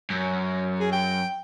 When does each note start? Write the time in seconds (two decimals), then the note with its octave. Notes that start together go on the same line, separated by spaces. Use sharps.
0.10 F#2
0.80 G#4
0.92 G5